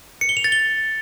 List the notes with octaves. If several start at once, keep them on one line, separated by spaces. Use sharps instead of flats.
C#7
G7
F7
A6
G7